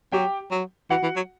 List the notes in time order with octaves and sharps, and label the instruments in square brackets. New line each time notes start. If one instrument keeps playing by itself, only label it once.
[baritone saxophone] F#3 [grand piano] G4 G5
[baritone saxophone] F#3
[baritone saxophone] E3 [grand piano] F#4 F#5
[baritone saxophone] E3
F#3